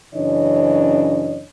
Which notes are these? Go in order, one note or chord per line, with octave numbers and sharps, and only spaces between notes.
F#2 C#3 E3 D4 C#5 D#5